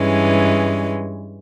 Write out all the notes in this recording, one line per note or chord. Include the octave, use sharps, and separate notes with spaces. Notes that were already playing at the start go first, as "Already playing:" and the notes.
Already playing: G2 E3 G#3 C#4